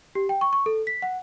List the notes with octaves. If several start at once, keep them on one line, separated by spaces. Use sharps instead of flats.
G4
G5
C#6
C#6
A4
B6
F#5